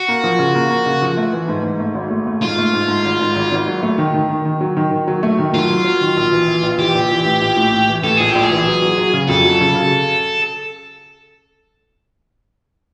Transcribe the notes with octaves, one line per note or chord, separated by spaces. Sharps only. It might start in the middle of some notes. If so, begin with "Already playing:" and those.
Already playing: F#4
A#3
F3
C#3
A#3
A#3
C#3
F3
A3
E3
G#2
G#2
A3
G#1
A3
A3
G#2 F4
A3
G#2
G#2
G#1
G#2
G#1
G#1
F#3
A3
D#3
D#3
D#3
D#3
F#3
D#3
D#3
F#3
A3
D#3
F#3 F4
F#3
F#3
D#3
A#1
E3
E3
A#1
E3 G4
A#1
E3
A2
A#1
A2
A2
E3
A2 A4
A#1 G#4
G4
A#1
G#4
E3
F#3
F#3
F#3
C#3
F2 A4
F#3
C#3
C#3